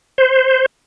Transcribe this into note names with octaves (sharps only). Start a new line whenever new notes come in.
C5